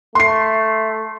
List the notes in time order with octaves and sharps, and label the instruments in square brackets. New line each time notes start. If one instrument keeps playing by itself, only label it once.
[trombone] A3 [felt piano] C6 C7